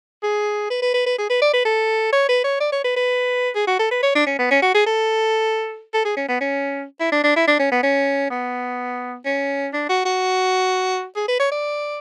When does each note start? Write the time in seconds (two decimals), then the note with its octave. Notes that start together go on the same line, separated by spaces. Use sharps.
0.23 G#4
0.70 B4
0.82 B4
0.94 B4
1.06 B4
1.18 G#4
1.30 B4
1.42 D5
1.53 B4
1.65 A4
2.13 C#5
2.29 B4
2.44 C#5
2.60 D5
2.72 C#5
2.84 B4
2.96 B4
3.55 G#4
3.67 F#4
3.79 A4
3.91 B4
4.03 C#5
4.15 D4
4.27 C#4
4.39 B3
4.51 C#4
4.62 F#4
4.74 G#4
4.86 A4
5.94 A4
6.05 G#4
6.17 C#4
6.28 B3
6.41 C#4
7.00 E4
7.12 D4
7.24 D4
7.36 E4
7.47 D4
7.59 C#4
7.72 B3
7.83 C#4
8.31 B3
9.25 C#4
9.73 D4
9.89 F#4
10.05 F#4
11.16 G#4
11.28 B4
11.40 C#5
11.52 D5